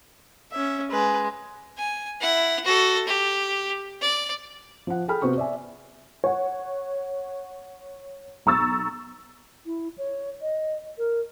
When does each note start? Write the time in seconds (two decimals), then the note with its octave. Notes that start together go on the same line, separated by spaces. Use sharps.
0.52 C#4 E5
0.91 G#3 B4
1.77 G#5
2.21 E4 F#5
2.65 F#4 A4
3.07 G4
4.01 D5
4.87 F3 F#5
5.08 G#4 A4 G5 B5 F6
5.22 C3 B3 F#4 C5 C#6
5.38 D5 E5 G#5
6.24 C#5 F#5
8.46 B1 A#5 C#6 E6 A6
9.66 E4
9.98 C#5
10.42 D#5
10.98 A#4